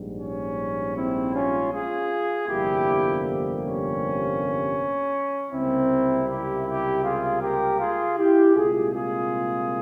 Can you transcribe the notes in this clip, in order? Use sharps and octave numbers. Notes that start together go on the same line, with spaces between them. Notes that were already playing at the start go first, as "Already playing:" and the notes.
Already playing: A#1 G#2 G3
C#4
C4 E4
C#4 F4
F4 G#4
G1 F2 C3 G3 A#3 E4 G4
C#4
C#2 C3 G3 A#3 C4 E4
E4 G4
E4 G4
F4 G#4
G4 A#4
F4 G#4
E4 G4
C2 A#2 G#3 F4 G#4
F4 G#4